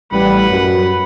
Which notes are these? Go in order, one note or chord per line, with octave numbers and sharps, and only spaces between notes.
A1 G3 B4 F#5 B5
F#2